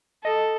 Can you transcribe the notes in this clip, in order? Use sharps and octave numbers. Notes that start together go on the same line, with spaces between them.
A4 D#5